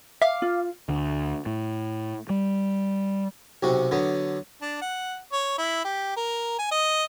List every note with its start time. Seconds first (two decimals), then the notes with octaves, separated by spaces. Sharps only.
0.22 E5 F5 D6 F6
0.42 F4
0.89 D2
1.46 A2
2.30 G3
3.63 B1 C3 F#4
3.91 D3 F#3 B3
4.61 D4
4.81 F#5
5.32 C#5
5.58 E4
5.84 G4
6.16 A#4
6.59 G#5
6.71 D#5